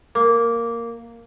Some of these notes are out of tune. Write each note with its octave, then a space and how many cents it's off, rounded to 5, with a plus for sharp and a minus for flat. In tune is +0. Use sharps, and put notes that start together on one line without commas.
A#3 -5